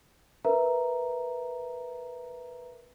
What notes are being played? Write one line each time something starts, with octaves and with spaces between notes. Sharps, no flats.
A#4 B4 E5 A#5